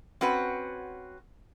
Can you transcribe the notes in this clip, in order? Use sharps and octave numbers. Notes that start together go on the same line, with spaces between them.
C4 C#4 F#4 B4 F#5